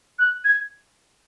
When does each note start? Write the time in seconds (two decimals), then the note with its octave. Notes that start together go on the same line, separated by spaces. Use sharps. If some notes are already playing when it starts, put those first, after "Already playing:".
0.19 F#6
0.44 G#6